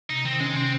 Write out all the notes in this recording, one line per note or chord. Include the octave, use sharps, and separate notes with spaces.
C3 D#4
D#3 C4
G#3 C#4
C3 C4